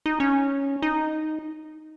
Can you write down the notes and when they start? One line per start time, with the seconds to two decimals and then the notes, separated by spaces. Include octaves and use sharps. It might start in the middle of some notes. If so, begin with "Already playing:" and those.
0.06 D#4
0.20 C#4
0.82 D#4